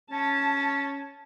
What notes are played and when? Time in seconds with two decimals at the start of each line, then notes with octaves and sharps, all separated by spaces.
0.11 C#4 A5